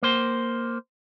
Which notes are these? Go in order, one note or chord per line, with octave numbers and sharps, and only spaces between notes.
A#3 C5